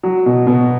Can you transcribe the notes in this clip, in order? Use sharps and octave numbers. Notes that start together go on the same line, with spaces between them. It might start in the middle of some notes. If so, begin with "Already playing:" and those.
F#3
B2
B2